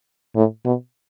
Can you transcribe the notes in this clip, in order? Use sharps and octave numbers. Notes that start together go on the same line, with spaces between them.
A2
B2